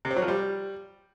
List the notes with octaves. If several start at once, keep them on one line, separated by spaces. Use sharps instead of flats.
C3
C4
F#3
F3
G3